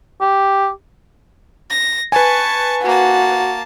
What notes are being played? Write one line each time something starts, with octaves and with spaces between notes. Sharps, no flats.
G4
A#6
B4 G#5 A5 C#6
A#3 F#4 A5